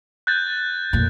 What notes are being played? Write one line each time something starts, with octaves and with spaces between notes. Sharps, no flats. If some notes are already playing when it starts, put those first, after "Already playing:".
F#6 G6 A6
F2 A#2